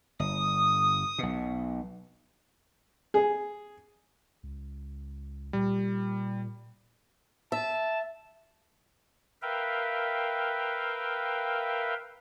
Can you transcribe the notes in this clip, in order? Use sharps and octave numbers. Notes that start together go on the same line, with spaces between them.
G1 D#6
B1 B2
G#4
C#2
A#2 G3
E5 A5
A#4 B4 E5 F5 G5